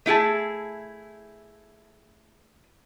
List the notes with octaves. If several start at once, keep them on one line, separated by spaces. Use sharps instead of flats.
A3 E4 G#4 A5